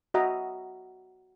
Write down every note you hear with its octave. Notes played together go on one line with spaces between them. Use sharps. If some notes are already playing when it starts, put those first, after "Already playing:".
F#4 D#5 E5 A#5